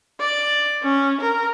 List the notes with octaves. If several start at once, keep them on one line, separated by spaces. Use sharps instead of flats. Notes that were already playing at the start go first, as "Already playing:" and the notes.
D5
C#4
A#4